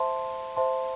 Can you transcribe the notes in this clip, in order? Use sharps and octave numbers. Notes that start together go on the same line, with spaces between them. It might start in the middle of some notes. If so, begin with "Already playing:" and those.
Already playing: C5 E5 A5 C6
C5 E5 A5 C6